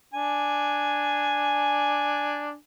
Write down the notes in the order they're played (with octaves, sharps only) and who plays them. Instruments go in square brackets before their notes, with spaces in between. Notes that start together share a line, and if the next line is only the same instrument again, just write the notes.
[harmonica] D4 G#5